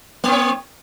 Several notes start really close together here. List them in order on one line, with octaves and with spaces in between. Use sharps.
A#3 C4 C#5